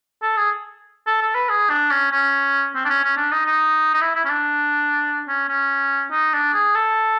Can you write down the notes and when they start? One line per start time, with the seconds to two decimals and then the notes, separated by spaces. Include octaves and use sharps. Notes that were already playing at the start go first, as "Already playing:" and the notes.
0.22 A4
0.37 G#4
1.06 A4
1.21 A4
1.35 B4
1.49 G#4
1.69 D4
1.91 C#4
2.11 C#4
2.75 C4
2.85 D4
2.89 C#4
3.04 C#4
3.17 D4
3.32 D#4
3.46 D#4
3.94 D#4
4.01 E4
4.15 E4
4.25 C#4
4.30 D4
5.28 C#4
5.48 C#4
6.11 D#4
6.33 D4
6.53 G#4
6.75 A4